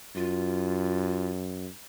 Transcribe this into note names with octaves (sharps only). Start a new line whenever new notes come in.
F#2 F4